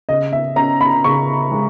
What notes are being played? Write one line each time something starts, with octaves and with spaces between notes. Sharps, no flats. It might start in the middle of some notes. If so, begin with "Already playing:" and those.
C#3 D#5
E5
C#4 A#5
B5
C#3 C#6
G#3